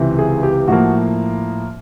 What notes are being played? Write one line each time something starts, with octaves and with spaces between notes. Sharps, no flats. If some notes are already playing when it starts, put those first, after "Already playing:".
Already playing: C#2 C3 E3
G#4
G4
A2 F3 A#3 F#4